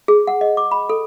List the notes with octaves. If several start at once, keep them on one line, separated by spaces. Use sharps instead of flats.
G#4
F#5
D#5
D6
B5
A4